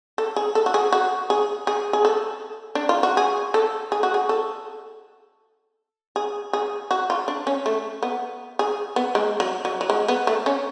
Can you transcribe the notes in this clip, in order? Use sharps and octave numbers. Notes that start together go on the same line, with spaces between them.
A4
G#4
A4
F#4
G#4
F#4
G#4
G#4
G#4
A4
D4
F4
F#4
G#4
A4
G#4
F#4
G#4
A4
G#4
G#4
F#4
F4
D4
C#4
A3
B3
G#4
B3
G#3
F#3
F#3
F#3
G#3
B3
A3
C#4